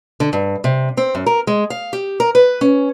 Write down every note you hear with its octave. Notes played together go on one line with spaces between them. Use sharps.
D3
G2
C3
C4
F#2
A#4
G#3
F5
G4
A#4
B4
C#4